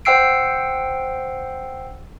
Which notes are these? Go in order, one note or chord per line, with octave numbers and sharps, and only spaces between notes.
C5 F#5 G5 E6 C7 D7